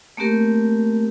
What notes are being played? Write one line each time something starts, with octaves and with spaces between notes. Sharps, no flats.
A3 A#3 C4 G4 A#4